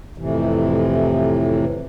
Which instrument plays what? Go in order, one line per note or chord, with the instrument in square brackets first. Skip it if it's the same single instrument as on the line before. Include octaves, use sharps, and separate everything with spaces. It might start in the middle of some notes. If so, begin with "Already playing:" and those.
[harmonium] F2 A2 C3 E3